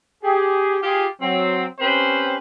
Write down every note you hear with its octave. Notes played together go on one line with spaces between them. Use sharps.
G4 G#4
F4 G4 G#4
F#3 C4
C4 C#4 G4 B4 C5